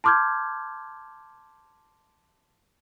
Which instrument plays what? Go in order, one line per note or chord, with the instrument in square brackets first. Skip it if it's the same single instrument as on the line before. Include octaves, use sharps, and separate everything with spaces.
[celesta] A5 C6 D6 F6 G6 G#6